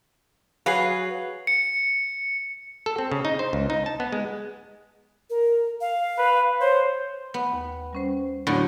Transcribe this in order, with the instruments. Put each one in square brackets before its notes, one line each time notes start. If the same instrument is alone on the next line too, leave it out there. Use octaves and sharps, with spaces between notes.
[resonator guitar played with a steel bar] F#3 G#4 B4 [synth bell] F5 C7
[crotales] C#7
[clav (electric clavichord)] A4
C4
C#3
D#4
C5
C#2
D#4
A5
B3
G#3
[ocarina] A#4
F5
[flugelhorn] B4
[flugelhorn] C5 [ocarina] C#5
[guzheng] B3
[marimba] D#2
G3 C#4 C5
[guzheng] A2 D3 [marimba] F#3 B3 F#4